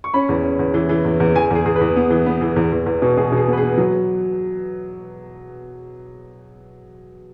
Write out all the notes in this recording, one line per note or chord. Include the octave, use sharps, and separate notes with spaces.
C#6
C#4 B5
E2
C#4
E2
E3
E3
E2
E2
E2 G#5
E2 G#4
E2 G#4
B4
E2
B3
E3
B3
E3
E2
E2
E2
B2
B2 G#4
B2
G#4
B3
B4
G#4
B3
F#3